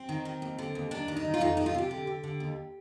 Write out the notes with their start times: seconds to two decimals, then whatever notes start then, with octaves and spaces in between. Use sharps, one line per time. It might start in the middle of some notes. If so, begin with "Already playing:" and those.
Already playing: C4
0.09 D#3
0.25 D#3
0.42 D#2
0.58 D3
0.75 D#2
0.91 D#3 D4
1.08 D#3
1.17 D#4
1.25 D#3
1.34 F4
1.41 F2 D#4
1.57 C3 D#4
1.66 F4
1.74 C3 G4
1.91 D3
2.07 D3
2.24 D3
2.40 D#2